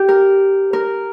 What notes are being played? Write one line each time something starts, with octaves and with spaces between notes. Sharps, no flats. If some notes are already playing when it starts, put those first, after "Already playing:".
Already playing: G4
A#4
A#4